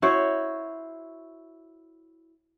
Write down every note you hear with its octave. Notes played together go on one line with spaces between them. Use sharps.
E4 F#4 C5 C#5